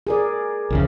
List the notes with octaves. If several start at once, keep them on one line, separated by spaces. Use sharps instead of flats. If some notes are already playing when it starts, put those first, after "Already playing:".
G#4 A#4 D5
C2 F2 C#3